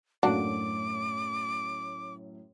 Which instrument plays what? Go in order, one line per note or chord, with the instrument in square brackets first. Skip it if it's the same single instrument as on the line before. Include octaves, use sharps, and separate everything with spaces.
[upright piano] F#2 A2 [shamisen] A#3 D4 F#4 [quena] D6